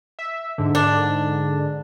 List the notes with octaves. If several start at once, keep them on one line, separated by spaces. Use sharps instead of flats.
E5
G#2 D3
D4